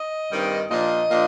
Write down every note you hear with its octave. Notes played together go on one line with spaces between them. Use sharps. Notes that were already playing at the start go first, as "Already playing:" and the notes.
Already playing: D#5
G2 D#3 G3 C4 D#4
A#2 F3 A#3 D4 D#5
A#2 F3 A#3 D4